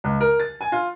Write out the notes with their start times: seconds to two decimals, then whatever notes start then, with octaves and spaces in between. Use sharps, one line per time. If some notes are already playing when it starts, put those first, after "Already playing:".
0.04 C#2
0.21 A#4
0.40 A6
0.61 G#5
0.72 F4